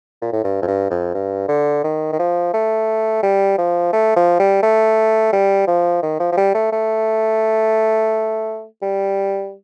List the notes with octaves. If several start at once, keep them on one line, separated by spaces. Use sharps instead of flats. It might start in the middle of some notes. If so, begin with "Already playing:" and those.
A#2
A2
G2
F2
G2
F2
G2
D3
D#3
D#3
F3
A3
G3
F3
A3
F3
G3
A3
G3
F3
D#3
F3
F3
G3
A3
A3
G3